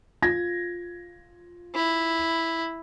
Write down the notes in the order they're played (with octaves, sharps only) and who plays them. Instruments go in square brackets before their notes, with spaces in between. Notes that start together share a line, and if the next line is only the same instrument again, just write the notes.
[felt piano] F4 G#6 A#6
[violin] E4